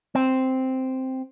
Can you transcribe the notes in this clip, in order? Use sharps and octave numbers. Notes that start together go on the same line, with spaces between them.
C4